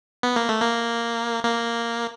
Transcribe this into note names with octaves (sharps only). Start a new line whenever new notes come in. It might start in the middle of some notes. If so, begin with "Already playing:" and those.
B3
A#3
A3
A#3
A#3